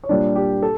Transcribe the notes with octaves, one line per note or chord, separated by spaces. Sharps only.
C#5
A#2 G3 A#3 D4 D5
G4
A4